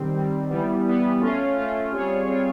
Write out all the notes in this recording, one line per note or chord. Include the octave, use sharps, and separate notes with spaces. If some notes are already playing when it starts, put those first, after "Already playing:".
Already playing: D#3 G3 C4
D#3 G3 C4
E3 G3 B3
E3 G3 B3
A3 C#4 F4
A3 C#4 F4
G3 C4 F4 G#4 C#5
G3 C4 F4 G#4 C#5